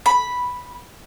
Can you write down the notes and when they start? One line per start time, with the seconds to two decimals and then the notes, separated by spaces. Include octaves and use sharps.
0.06 B5